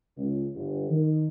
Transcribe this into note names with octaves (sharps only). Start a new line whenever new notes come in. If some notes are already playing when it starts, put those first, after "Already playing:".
C#2
G1
D#3